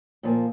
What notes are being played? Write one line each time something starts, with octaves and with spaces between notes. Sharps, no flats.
A#2 F3 A#3